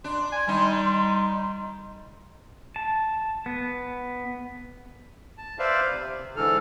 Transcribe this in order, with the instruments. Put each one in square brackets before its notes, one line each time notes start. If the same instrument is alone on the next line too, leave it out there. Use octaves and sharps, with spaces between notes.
[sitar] D4 [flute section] C6
[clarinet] G#5
[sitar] D#3 D#4 [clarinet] G3
[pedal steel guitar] A5
B3
[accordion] A5
B4 C5 D5 E5 F5
C3
G#2 D3 E3 A4 F6